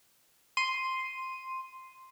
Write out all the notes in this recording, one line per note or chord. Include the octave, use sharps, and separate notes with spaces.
C6 D#7